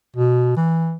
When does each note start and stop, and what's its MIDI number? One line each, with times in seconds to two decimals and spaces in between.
0.17 0.55 47
0.57 0.97 52